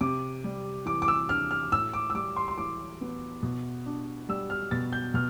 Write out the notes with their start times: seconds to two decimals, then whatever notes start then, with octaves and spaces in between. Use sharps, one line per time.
0.01 C3 D6
0.44 G3
0.86 E3 D6
1.02 D6
1.08 E6
1.29 D4 F6
1.51 F6
1.72 A2 E6
1.93 D6
2.10 E6
2.14 G3 D6
2.36 C6
2.48 C6
2.57 E3 D6
3.01 B3
3.43 B2
3.86 D4
4.29 G3 E6
4.50 F6
4.71 B2 A6
4.93 G6
5.14 B2 F6